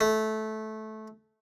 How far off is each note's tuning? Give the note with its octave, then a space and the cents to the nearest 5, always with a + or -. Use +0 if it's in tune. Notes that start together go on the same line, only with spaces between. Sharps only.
A3 -15